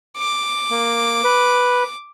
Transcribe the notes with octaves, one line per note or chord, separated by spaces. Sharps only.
D6
A#3
B4